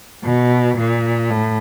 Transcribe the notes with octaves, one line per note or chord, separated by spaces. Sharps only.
B2
A#2
A2